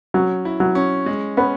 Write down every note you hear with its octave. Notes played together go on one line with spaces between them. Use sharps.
F#3 C#4
E4
F#3
C#4
G#3
B3 C#4